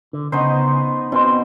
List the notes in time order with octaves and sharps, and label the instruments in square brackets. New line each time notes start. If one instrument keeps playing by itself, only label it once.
[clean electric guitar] D3
[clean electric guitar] C#3 [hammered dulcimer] B3 D#4 C5
[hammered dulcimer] B2 [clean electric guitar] C4 C#4 C5